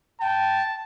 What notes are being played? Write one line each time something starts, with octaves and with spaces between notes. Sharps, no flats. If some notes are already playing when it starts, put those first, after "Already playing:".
G5 A5